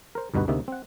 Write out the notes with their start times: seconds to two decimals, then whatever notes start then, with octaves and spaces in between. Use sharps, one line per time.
0.15 A#4 C5
0.34 D2 G2 B2 D#4 F#4 B4
0.48 D2 C3 A#3 D#4 E5
0.68 C4 F#5